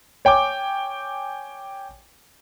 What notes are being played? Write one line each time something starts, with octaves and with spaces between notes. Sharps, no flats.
C#5 G5 G#5 D6